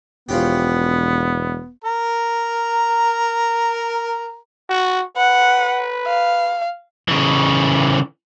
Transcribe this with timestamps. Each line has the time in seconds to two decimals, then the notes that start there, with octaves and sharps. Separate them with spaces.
0.29 E1 F3 B3 C#4 G4
1.84 A#4 A#5
4.70 F#4
5.17 B4 F#5
6.06 F5
7.08 C#3 E3